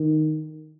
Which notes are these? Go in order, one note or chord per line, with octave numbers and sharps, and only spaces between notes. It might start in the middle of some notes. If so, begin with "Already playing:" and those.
Already playing: D#3